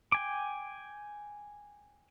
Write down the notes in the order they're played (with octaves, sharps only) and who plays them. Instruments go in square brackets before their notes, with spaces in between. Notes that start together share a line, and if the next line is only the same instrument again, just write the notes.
[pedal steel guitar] G5 G#5 D6